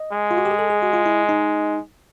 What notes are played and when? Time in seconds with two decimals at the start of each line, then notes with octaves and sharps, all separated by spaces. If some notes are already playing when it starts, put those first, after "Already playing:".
Already playing: D#5
0.12 G#3
0.31 F4
0.38 F#4
0.45 G4
0.51 G#4
0.59 A4
0.70 G#4
0.82 F#4
0.93 F4
1.06 E4
1.29 D#4